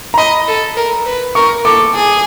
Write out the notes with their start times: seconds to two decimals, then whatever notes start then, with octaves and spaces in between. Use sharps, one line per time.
0.14 A#5
0.18 D#5 B5
0.48 A4
0.77 A#4
1.06 B4
1.35 A#4 C#6
1.65 A4 D6
1.95 G#4